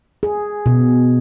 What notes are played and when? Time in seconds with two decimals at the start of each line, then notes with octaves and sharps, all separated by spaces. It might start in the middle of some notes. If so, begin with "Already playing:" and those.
0.23 G#4
0.66 B2